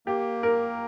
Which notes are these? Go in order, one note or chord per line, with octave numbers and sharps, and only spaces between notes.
A#3 G4
A#4